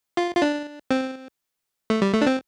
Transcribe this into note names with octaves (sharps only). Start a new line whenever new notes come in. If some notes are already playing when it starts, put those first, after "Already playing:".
F4
F4
D4
C4
A3
G3
A3
D4
C4